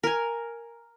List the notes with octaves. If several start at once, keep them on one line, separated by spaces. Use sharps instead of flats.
A#4 G#5